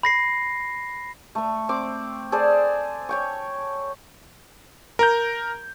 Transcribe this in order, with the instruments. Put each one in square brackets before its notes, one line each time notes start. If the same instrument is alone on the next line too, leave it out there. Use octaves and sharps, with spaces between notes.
[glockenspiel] B5 A#6 C7
[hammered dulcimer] A3 C#6
C4 D6
G#4 A4 C5 D5
C#5 G5 C#6
[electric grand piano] A#4 A#5 G6